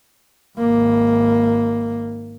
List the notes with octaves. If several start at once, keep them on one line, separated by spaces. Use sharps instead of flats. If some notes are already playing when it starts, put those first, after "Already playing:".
G#1 A#3